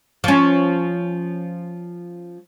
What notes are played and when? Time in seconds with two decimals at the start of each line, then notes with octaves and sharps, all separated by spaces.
0.24 F3 C#4